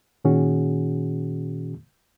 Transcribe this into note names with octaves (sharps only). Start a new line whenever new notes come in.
A#2 D#3 C#4 F#4 G#4